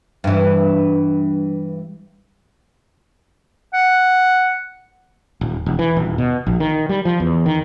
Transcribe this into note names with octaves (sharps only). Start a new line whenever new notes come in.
G2 E3
F#5
D#1
E1
E3
D#1
B2
A#1
D#3
G3
F3
E2
D#3